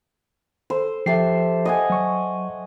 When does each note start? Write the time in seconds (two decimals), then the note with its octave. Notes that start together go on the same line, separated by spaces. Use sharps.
0.70 A4 C5
1.06 F3 G4 A4 E5 C7
1.65 D#5 F#5 G#5
1.90 F#3 C#6